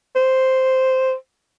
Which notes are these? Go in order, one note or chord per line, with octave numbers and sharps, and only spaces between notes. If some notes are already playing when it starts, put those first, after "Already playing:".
C5